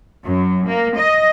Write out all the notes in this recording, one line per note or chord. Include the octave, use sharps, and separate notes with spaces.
F#2
A#3
D#5